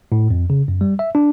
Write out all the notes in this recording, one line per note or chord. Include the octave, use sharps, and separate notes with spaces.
A2
F2
C#3
F#2
G3
E5
D4